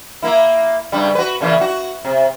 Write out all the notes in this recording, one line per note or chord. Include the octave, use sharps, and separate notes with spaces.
A#3 E4
G2 C#3 G3
F#4 B4
A#2 C#3 E3
F#4
C3